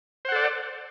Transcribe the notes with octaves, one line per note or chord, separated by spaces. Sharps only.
A4 C5 D5 F#5